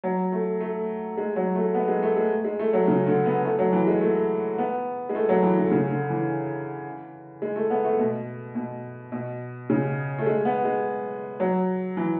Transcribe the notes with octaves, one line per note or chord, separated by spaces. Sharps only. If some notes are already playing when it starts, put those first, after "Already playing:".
F#3
A3
A3
G#3
F#3
A3
B3
G#3
A3
G#3
G#3
A3
F#3
C#3
D3
B3
A3
F#3
E3
G#3
A3
B3
G#3
A3
F#3
E3
D3
C#3
D3
E3
G#3
A3
B3
A3
B2
B2
B2
C#3
A3
G#3
B3
G#3
F#3
E3